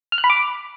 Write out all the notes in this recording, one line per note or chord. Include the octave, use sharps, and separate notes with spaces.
F6
F#6
B5
D6